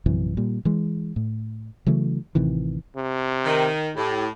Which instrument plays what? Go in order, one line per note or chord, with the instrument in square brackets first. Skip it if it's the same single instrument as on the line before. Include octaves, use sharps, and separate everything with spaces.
[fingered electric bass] A#1 F#2 C3 E3
A#2 G3
E3 G#3
A2
C#3 E3 F#3 A3
A1 C3 D#3 E3
[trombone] C3
[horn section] D#3
[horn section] A2 [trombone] G4